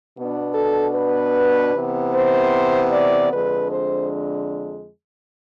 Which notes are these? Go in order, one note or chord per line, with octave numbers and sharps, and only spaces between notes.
B2 B3 D4
A4
B4
C3 E3 B3
C5
D5
F2 D3 G#3 D4 B4
C5